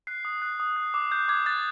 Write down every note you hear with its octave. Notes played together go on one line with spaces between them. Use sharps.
F#6 C7
D#6
F#6
D#6
F#6
D6
F#6 G6
D6 G#6
F#6 A6